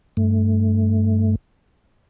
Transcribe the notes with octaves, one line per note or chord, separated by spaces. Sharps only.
G2 A3